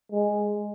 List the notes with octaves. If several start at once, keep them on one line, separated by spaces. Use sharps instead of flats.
G#3